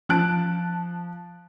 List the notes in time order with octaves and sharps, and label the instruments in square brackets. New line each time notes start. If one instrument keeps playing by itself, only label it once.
[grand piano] F3 A5 F#6 D7